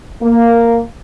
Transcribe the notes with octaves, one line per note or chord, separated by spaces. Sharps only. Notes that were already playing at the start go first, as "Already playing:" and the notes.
A#3